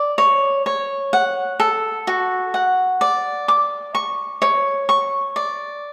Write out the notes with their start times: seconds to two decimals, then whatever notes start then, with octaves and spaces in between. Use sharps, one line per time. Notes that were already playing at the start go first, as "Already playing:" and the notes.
Already playing: D5
0.18 C#5
0.66 C#5
1.13 F#5
1.60 A4
2.07 F#4
2.54 F#5
3.01 D5
3.48 D6
3.95 C#6
4.42 C#5
4.89 C#6
5.36 D5